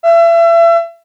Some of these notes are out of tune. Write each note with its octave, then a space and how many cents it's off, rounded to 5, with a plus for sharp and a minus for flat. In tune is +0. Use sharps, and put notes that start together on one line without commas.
E5 +35